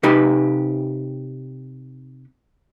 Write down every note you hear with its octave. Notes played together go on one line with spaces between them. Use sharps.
C3 D#4 G4 B4 B5